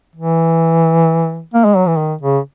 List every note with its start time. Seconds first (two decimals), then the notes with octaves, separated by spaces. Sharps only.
0.15 E3
1.54 A#3
1.65 G#3
1.76 F#3
1.87 E3
1.97 D#3
2.21 C#3